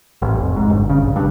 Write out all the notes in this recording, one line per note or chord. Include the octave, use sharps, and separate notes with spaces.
A1
F1
G#2
G1
C#3
A#1
G2